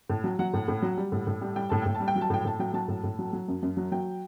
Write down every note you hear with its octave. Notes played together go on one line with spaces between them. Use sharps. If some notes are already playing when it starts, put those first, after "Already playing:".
A2
F#3
F#3 F#5
A2
A2
F#3
G3
A2
A2
G3
G3 G5
A2 A5
A2 G5
A5
G3
G5
F#3
A5
A2 G5
A2 A5
F#3 G5
F#3 A5
A2
A2
F#3
F#3
F#2
F#2
F#3
F#3 G5